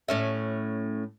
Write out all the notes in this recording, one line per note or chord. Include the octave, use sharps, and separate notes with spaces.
A2 C#4 E5